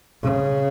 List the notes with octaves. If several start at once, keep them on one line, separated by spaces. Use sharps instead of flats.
C#3